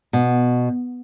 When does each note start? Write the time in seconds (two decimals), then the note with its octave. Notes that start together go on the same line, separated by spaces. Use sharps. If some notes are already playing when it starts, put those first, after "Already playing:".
0.13 B2